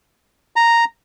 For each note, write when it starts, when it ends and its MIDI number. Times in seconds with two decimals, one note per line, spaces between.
0.56 0.85 82